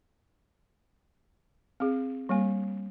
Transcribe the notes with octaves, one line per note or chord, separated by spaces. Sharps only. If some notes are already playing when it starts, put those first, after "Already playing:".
C4 G#4
G3 A#3 G#5